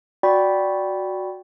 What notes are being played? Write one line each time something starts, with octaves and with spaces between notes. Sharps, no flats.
F#4 D5 G5 B5